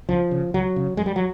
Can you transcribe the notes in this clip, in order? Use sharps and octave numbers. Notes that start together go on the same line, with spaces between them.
C#2 F3
C#3
C#2 F#3
C#3
F#2 G#3
G3
F#3